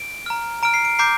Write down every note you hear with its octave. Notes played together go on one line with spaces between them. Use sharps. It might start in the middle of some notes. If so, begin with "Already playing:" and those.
Already playing: D7
A#5 F6
A#5 F6 D7
C7
D7
A#5 D6 G6 C7